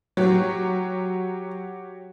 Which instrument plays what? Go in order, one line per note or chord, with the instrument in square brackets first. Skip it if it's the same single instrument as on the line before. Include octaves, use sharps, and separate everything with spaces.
[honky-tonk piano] F#3 [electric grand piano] F#4 G4 C#5